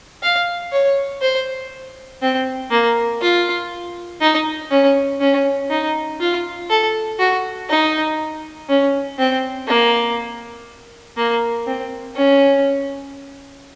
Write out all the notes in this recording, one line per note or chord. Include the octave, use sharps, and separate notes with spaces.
F5
C#5
C5
C4
A#3
F4
D#4
C#4
C#4
D#4
F4
A4
F#4
D#4
C#4
C4
A#3
A#3
C4
C#4